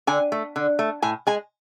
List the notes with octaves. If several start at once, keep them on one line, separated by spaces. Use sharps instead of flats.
D3 G#5
A3
D3
A3
A2 G#5
G#3 G#5